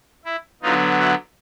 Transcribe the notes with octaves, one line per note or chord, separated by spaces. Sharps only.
E4
D3 F#3 B3 D#4 F4
E4 F#4